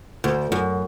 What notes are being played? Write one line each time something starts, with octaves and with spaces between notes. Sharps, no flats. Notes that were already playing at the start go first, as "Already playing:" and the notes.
D2
F#2